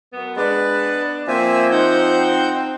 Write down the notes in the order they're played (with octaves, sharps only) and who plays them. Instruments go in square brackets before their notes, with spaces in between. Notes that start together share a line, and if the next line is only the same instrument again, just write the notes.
[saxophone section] F#2 B3
[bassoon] G#3 [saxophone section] B3 D4 [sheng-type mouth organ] B4
[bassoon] F3 [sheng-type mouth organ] A#3 E5 G#5 [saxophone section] C4
[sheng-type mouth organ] D#4 F#5 G6